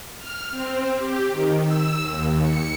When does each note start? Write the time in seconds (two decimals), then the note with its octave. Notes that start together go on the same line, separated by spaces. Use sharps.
0.19 F6
0.50 C4
0.97 G4
1.31 D#3
1.63 E6
2.01 D#2
2.42 C#7